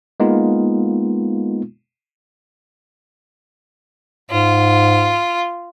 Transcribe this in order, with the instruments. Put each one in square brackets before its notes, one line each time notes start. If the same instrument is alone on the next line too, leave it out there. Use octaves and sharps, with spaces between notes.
[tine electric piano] G#3 A#3 B3 D#4 F4
[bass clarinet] G#2 [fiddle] F4